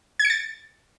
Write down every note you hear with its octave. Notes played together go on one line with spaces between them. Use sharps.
G#6
C#7
A6